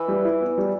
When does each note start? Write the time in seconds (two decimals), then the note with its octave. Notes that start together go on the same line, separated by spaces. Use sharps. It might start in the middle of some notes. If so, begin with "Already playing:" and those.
Already playing: E3
0.08 G3
0.24 E4
0.41 B3
0.58 G3